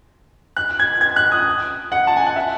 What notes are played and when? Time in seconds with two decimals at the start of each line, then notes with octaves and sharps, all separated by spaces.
0.57 F#6
0.80 G#6
1.01 G#6
1.16 F#6
1.32 D#6
1.92 F#5
2.07 A5
2.17 G#5
2.27 F#5
2.36 E5